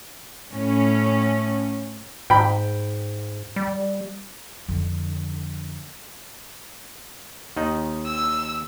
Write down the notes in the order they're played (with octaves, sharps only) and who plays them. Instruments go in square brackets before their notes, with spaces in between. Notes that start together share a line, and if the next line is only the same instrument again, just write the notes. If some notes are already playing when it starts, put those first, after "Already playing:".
[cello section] A2 C#4
[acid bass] G#2 [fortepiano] G5 B5
[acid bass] G3
[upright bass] F2 D3
[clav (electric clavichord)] D#2 D#3 D#4
[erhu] E6